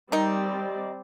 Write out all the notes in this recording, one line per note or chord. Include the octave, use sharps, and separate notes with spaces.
D#3 G3 C4 D#4 D5